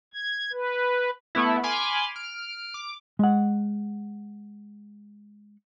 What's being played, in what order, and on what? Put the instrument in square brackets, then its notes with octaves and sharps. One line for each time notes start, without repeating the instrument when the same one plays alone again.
[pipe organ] G#6
B4
[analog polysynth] A3 B3 E4
G#5 B5 C6 D6 F6
F6 D7
D6
[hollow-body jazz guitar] G#3 F#5